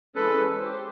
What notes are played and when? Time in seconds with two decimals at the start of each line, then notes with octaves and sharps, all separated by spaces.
0.15 E3 G#3 C#4 A4 B4
0.60 G4 C5